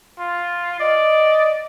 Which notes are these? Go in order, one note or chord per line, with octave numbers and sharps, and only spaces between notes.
F4
D5 D#5